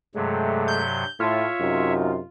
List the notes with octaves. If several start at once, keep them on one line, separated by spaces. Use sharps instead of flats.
G2 C3 F#3 G#3 A3
G6
A2 F4 C#5 E5
F#2 C3 D#4